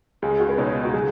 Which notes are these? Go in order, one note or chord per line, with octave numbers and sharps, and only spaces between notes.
C#2 C#3 G#3 G#4
F#4
B4
C#2 B2 G#3 D#4 C#5
F#4
C#3 F#3 G#4